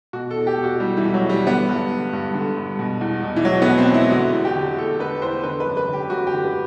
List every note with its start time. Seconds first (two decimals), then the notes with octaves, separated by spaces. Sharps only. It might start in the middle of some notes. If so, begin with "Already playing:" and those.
0.13 B2 F#4
0.31 A4
0.36 E2
0.47 G4
0.58 B2
0.64 F#4
0.80 E2 G3
0.97 E3
1.02 B2
1.14 F#3
1.24 E2
1.29 G3
1.47 D3 B3
1.68 G2
1.91 D3
2.13 G2
2.34 D3
2.57 G2
2.79 B2
3.01 E2
3.22 B2
3.36 E3
3.45 E2 F#3
3.62 B3
3.68 B2
3.78 C4
3.90 E2 E4
4.11 D3 F#4
4.33 E2
4.45 G4
4.55 D3
4.77 E2 A4
4.99 D3 B4
5.22 E2 C5
5.44 D3 B4
5.60 B4
5.66 F#2
5.77 B4
5.89 D3 G4
6.10 F#2 F#4
6.27 G4
6.33 D3
6.44 B4